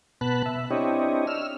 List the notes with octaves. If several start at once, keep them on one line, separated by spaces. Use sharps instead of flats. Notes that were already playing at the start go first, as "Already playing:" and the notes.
B2 B3 A5 B5 F#6
E5
C4 D4 E4 G4 C#5 D#5
E6 F6